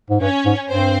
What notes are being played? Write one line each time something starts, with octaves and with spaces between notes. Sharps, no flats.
G#2
G2 C#4 C#5
G#2
G2 C4 C5